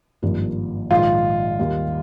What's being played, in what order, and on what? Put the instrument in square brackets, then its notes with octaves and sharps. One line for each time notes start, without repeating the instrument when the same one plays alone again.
[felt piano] G#1 G2 F3 A#3
[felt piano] A#1 G#2 D#3 [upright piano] F4
[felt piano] D#2 D#3 G3